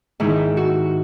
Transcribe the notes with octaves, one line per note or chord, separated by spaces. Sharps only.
G#2 D#3 E4
F#4